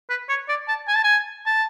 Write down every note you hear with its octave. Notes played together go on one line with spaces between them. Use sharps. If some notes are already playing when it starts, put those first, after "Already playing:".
B4
C#5
D5
A5
G#5
A5
G#5
A5